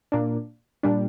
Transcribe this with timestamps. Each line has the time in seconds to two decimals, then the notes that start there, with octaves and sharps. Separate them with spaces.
0.12 A#2 A#3 D4
0.83 A#2 G3 D4